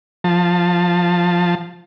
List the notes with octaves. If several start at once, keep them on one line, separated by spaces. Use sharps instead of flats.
F3 A5